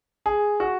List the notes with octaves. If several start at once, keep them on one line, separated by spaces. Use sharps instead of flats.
G#4
F#4